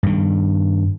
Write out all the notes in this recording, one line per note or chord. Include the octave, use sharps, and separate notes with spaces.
G2 D#3